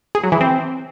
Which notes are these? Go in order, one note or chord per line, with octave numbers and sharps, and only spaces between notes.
G#4
F#3
E3
C4